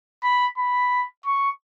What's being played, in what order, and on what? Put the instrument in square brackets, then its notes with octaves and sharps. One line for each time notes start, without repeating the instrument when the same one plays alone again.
[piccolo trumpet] B5
B5
C#6